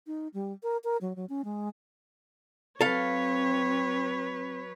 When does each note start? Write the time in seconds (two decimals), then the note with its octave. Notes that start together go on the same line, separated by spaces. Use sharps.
0.07 D#4
0.34 G3
0.63 A#4
0.84 A#4
1.01 F#3
1.16 F#3
1.29 C#4
1.45 G#3
2.81 F#3 C4 A4 B4 C#5 F5